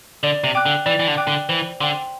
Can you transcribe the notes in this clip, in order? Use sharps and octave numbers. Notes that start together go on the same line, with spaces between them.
D3 D5
C3
G5 D6 F#6
D3
E3 D5
E3
D3
G5 D6 F#6
D3
E3 C5
D3 G5 C6